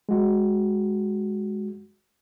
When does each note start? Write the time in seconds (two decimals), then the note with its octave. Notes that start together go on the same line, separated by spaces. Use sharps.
0.09 G#3 F#4